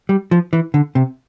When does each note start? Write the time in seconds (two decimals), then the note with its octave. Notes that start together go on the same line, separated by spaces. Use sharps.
0.09 G3
0.31 F3
0.53 E3
0.74 D3
0.95 C3